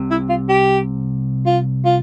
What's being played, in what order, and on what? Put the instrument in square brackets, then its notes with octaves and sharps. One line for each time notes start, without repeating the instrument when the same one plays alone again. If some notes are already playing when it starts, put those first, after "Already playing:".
Already playing: [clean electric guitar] C2 C3
[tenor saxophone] E4
F4
G4
F4
F4